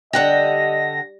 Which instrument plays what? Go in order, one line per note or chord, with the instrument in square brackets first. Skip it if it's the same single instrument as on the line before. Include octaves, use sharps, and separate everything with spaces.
[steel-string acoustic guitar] D3 F#5 G5 [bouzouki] G3 [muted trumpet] D#5 [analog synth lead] A#6